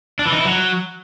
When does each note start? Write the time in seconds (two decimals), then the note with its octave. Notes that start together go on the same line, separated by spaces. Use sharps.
0.19 D4
0.26 E3
0.32 D#4
0.39 E4
0.45 F#3